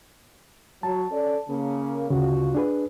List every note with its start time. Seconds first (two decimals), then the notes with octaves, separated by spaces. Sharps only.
0.83 F#3 A5
1.12 C#4 A4 D5
1.49 C#3 A#3
2.10 D2 G2 C#3 F4 F#4
2.55 D4 G#4 B4